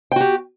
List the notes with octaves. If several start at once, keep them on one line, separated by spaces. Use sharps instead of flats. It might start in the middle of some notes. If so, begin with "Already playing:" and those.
F#4 G4 G5